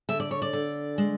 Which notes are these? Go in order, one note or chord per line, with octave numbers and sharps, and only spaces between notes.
D3 E5
D5
C#5
D5
D3
G#3